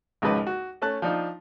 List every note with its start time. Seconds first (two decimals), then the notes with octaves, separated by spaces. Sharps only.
0.22 G#1 C#2 C#3 F3 B4 D#5
0.47 F#4
0.82 A3 C#4 A5 F#6
1.02 F3 D4 D#4 F4